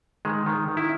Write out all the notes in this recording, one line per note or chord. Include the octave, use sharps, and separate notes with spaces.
D#3 G#3
D#3
D#3
E4